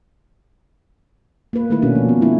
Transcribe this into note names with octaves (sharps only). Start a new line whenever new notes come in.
A#3 B4
D#3 A3 A#3 E4 B4
B2 C#4 D4 F#4
F3
B3
G#3 A3 E4